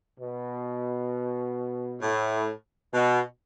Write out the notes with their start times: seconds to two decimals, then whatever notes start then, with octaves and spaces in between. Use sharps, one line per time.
0.19 B2
2.01 A2
2.93 B2